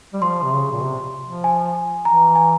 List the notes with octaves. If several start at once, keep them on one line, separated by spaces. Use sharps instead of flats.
G3
F3 C6
C3
C#3
A#2
C3
F3
G#5
E3 A#5
G#5